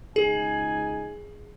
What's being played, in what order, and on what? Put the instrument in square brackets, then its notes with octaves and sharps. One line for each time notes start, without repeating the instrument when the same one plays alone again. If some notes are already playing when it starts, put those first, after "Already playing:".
[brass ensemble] C#2 D#4 G#5 [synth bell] G#4